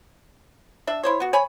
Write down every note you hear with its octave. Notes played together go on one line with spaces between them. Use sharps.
D4 E5
E4 C5 C#5
B3 F#4
C#5 G#5 B5